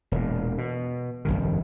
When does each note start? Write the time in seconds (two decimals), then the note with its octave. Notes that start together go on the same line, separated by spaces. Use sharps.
0.12 E1 A#2
0.58 B2
1.25 F1 C2 G2 D#3